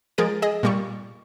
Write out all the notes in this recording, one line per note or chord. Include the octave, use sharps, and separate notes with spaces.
F3 G#3 G#4 A#4 A6 D7
G#4 D#5
A#2 G3 C#6